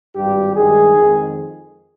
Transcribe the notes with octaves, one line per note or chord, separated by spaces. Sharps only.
G#1 G2 G3 G4
G2 D#3 G#3 G#4
F2 D#3 G#3